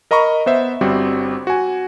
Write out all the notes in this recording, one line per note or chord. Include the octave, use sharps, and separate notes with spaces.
A#4 D#5 A#5 B5 C#6
B3 C5 E5
G1 G3 C4 F#4
F#4 G#5